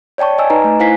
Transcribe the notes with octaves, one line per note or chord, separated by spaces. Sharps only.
C#5 D5 G5 A5 C#6
D#5 G#5 E6
D#4 B4 D#5 A#5
A3
E4 C5 F5 G#5 B6 C7